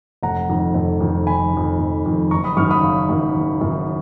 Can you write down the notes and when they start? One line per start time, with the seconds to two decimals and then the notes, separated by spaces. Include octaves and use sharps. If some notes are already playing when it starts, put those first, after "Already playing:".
0.23 F1 F#5 A#5
0.49 F2 D#3
0.74 F1
1.00 F2 D#3
1.27 F1 G#5 B5
1.54 F2 D#3
1.79 F1
2.06 F2 D#3
2.31 F#1 A#5 C#6
2.44 B5 D#6
2.57 F#2 D#3 C#6 F6
2.70 B5 D#6
2.83 F#1 F5
3.09 F#2 D#3
3.36 F#1
3.61 F#2 D#3